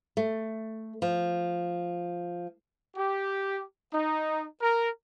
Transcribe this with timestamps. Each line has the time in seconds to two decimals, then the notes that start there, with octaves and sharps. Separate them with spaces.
0.17 A3
1.02 F3
2.95 G4
3.93 D#4
4.60 A#4